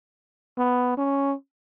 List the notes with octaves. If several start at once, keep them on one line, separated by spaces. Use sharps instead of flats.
B3
C#4